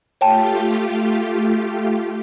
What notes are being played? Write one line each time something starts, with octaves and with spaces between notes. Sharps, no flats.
A3 F4 G4 C#5 G5 A5